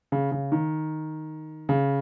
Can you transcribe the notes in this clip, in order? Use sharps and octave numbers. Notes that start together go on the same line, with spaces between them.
C#3
C#3
D#3
C#3